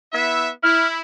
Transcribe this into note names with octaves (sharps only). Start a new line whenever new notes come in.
B3 E4 E5
E4 F6